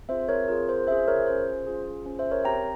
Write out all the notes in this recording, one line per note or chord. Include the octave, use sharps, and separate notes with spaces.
C4 F4 G#4 C5 E5
A#4 C#5
C4 F4 G#4 A#4
C5
C#4 F4 G#4 C5 E5
A#4 C#5
C#4 F4 G#4 C5
C#4 F4 G#4
C#4 F4 G#4 C5
C5 E5
A#4 C#5
C4 G4 G5 A#5